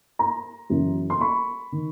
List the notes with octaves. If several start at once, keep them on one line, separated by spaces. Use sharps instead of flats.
A#5 C6
F#2 C#3 E3
C6
B5 C#6
D#3